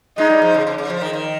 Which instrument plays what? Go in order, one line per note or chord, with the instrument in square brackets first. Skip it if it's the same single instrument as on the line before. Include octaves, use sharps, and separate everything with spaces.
[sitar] G#3 [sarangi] D#4
[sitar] G3
F3
C#3
C#3
C#3
F3
D#3
D#3